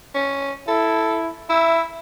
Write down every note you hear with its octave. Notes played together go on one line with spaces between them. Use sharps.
C#4
E4 A4
E4 E5